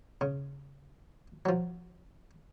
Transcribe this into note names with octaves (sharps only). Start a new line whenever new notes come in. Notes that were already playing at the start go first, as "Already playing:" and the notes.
C#3
F3 F#3